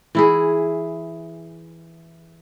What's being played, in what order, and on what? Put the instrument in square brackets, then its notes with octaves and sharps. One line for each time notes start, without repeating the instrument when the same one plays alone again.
[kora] E3 E4 G#4